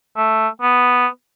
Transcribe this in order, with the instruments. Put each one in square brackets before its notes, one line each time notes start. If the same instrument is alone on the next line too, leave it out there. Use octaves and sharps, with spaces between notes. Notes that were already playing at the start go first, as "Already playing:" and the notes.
[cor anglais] A3
B3